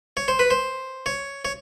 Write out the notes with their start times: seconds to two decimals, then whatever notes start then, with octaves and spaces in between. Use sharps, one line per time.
0.17 C#5
0.28 C5
0.39 B4
0.51 C5
1.06 C#5
1.45 C#5